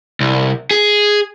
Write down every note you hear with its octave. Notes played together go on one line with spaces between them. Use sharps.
C2
G#4